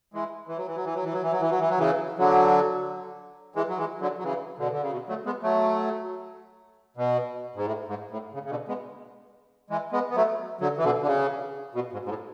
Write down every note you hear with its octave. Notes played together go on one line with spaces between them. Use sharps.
E3 G#3
E3
F#3
E3
F#3
E3
F#3
E3
F#3
E3
F#3
E3
F#3
E3
F#3
C#3 E3
D3 F#3
E3 G#3
F#3
E3 G#3
D3 F#3
F#3
C#3 E3
B2 D3
D3
C#3
B2
F#3 A3
G#3 B3
F#3 A3
B2
G#2
A2
G#2
A2
C#3
C#3
B2 D3
G#3 B3
E3 G#3
G#3 B3
B3
F#3 A3
D3 F#3
E3
B2 D3
D3
C#3
B2
G#2
G#2
A2